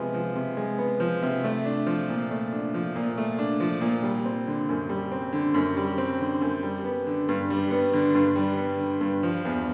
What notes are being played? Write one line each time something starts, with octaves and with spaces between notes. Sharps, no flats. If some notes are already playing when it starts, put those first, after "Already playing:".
Already playing: C3 F3 G#3 B3
F3
C3
G#3
B3
F3
C3
A3
D4
F3
A#2
A3
D4
F3
A#2
A3
D4
F3
A#2
G3
C4
D3
F#2
G3
C4
D3
F#2
G3
C4
D3
F#2
G3
B3
D3
G2
G3
B3
D3
G2
G3
B3
D3
G2
F3
E2